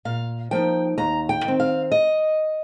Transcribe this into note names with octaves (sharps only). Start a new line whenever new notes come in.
A#2 F5
F3 A#3 D#4 G5
D#2 A#5
G5
D#3 C4
F5
D#5